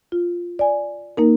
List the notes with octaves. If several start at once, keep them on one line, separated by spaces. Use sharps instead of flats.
F4
D5 G#5
A#3 D#4 A#4